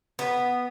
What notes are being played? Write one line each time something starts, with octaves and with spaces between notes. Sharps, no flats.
B3